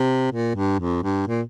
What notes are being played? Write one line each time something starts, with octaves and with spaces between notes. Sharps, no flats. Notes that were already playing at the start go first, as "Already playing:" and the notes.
Already playing: C3
A#2
G2
F2
G2
A#2